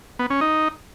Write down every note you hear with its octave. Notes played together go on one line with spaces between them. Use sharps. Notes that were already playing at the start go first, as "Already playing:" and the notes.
B3
C#4
D#4